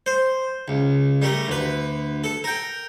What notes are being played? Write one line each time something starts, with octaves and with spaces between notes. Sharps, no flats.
C5
C#2
G3 A3 A#4
D2 B4
A4
A#4 G5